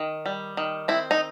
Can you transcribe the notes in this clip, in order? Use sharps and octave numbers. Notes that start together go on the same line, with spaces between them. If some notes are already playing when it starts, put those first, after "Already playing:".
Already playing: D#3
G3
D#3
C4 E4
D#4